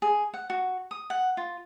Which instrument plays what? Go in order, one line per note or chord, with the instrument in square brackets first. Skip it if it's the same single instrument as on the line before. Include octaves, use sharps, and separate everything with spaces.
[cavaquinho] G#4
F#5
F#4
D#6
F#5
F4